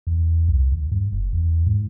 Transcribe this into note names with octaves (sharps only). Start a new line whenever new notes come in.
E2
C2
D#2
G2
F#1
E2
G#2